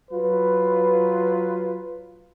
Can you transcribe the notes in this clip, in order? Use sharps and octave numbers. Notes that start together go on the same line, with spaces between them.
F#3 F4 B4